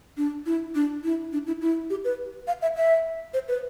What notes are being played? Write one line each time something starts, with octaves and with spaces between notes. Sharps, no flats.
D4
E4
D4
E4
D4
E4
E4
G4
B4
F5
E5
E5
C5
B4